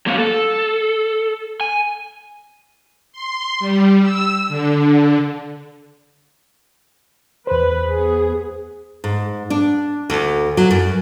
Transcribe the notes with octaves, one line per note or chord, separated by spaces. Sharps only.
F#3 A#3 C#4 F#4 C#5 F5
A4
G#5
C6
G3
E6
D3
E2 B4 C5
B3 G#4
G#2
D4
D2
F#3
F#2